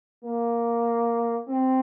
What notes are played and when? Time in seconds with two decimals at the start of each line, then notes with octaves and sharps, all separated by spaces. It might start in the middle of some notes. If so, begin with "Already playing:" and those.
0.24 A#3
1.49 C4